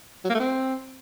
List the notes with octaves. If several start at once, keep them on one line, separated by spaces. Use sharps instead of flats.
F#3
A#3
A3
C4